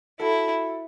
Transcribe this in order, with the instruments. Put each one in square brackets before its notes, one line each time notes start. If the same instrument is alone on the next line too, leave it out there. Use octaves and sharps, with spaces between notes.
[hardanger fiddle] E4 [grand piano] F#4 A4